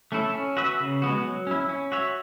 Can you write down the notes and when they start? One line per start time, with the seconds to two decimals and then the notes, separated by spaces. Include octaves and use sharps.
0.12 A3 C#4 E4 A4
0.34 C#4
0.57 F#4 B4 E5
0.80 C#3
1.02 G#3 B3 F#4
1.24 F#3
1.47 C#4 E4
1.69 C#4
1.92 F#4 C#5 E5